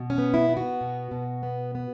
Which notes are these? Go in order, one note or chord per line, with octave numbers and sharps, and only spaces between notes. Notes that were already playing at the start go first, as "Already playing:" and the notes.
Already playing: B2
C#4
B3
E4
B3
F#4
B2
B2
B3
B3